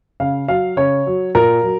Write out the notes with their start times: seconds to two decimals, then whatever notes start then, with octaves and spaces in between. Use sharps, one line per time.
0.20 C#3 F5
0.48 F#3 F5
0.77 C#3 C#5
1.07 F#3
1.35 A#2 A#4
1.63 F#3